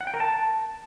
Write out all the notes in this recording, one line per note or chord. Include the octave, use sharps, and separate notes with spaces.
F#5
G5
A#4
A5